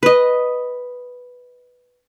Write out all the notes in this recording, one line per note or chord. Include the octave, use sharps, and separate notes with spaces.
B4 D#5